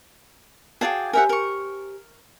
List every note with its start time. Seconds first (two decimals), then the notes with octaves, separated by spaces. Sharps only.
0.81 F#4 G#4 D5 F5 G5 A5
1.13 G4 A#4 C5 E5 F#5 G#5
1.29 A#4 C#6